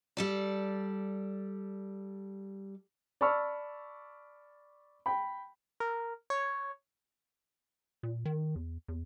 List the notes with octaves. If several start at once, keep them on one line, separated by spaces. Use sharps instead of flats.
G3 A4 D5
D5 A5 B5 C#6 E6 F6
G5 B5
A#4
C#5
A#2
D#3
E2
E2